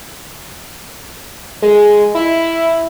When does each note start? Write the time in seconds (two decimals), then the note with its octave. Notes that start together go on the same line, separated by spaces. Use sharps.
1.62 G#3
2.15 E4